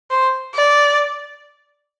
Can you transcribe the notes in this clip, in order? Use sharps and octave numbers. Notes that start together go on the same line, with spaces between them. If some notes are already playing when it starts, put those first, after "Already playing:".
C5
D5